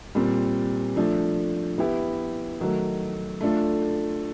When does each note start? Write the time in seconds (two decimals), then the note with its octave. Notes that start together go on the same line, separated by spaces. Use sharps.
0.15 A#2 G3 C4
0.96 F3 A3 D4
1.78 B3 E4 G4
2.60 D#3 F#3 A3
3.41 A3 D4 F4 A4